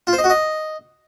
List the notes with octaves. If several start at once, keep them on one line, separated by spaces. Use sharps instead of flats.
F4
C5
D#5
F#4
D#5